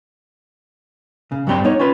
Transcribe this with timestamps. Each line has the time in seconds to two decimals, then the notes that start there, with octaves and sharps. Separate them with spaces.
1.32 C#3
1.47 G2 F#3 G3 C4 C6
1.64 B3 D#4 C#5
1.79 C#4 F4 B4 C6